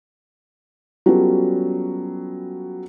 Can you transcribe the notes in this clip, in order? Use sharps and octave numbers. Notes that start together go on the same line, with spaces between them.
F#3 G3 B3 C#4 F4 A4